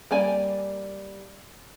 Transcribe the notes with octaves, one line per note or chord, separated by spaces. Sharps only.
G3 A#3 D5 G#5